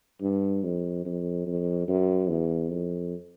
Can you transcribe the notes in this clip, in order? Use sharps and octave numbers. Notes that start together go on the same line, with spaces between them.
G2
F2
F2
F2
F#2
E2
F2